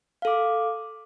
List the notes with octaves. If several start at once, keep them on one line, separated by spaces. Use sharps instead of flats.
A4 F5 D6